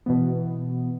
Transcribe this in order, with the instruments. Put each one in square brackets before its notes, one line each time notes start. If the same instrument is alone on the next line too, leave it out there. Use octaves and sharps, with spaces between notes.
[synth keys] B2 E3 B3